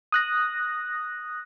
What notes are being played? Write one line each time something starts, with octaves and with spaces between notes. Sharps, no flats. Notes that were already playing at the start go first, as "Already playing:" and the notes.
D#6 F#6 A#6